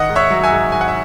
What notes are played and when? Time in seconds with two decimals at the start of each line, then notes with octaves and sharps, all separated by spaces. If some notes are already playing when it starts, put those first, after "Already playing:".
Already playing: D#3 D#5 F#5
0.09 G#2
0.16 C#5 E5
0.30 F#3
0.44 E5 G#5
0.52 G#2
0.72 G#2 G#5
0.81 F#5
0.88 E5